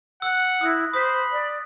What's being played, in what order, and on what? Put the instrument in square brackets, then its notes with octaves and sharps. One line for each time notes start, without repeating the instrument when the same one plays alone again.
[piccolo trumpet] F#5 [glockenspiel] E6 F#6
[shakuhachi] E4 [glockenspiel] D#6 F#6 A#6
[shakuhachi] C5 [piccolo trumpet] B5 [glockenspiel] D#6 B6
[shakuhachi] D5